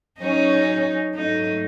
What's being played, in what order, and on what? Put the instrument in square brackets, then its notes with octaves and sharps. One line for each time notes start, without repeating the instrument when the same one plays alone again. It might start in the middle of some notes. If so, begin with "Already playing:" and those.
[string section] F#3 C#4 G#4 [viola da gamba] D#4
[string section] G#2 F#3 A3 [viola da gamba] D#4